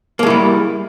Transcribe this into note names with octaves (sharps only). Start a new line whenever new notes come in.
G3 G#3 A#3 E4